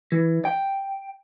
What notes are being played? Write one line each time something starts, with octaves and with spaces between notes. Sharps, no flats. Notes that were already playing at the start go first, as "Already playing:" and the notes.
E3
G5